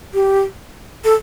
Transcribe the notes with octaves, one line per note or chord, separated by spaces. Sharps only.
G4
A4